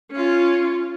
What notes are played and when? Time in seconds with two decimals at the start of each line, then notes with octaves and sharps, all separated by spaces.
0.12 C#4 F4